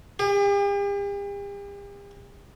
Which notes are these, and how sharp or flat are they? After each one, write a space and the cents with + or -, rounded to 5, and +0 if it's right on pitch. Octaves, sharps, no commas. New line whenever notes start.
G4 +45